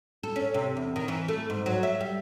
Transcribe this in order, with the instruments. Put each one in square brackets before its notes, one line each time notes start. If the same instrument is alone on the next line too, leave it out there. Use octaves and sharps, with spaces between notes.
[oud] A4
C#4
C3
E2
D#3
E3
A3
G#2
F#3
E5
G3